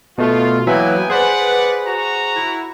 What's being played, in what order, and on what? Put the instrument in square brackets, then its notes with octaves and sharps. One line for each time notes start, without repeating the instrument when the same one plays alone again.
[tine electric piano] B2 A3 [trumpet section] F4
[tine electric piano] E3 F#3 E5 [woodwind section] A#3 B4 [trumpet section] B3 G5 G#5
[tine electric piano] G#4 C5 [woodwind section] B4 [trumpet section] D5 F#5
[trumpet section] F#4 A#5
[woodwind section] E4